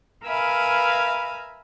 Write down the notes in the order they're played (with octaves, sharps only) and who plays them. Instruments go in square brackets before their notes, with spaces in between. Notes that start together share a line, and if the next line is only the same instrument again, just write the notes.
[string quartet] A#4 B4 E5 F5 G#5 B5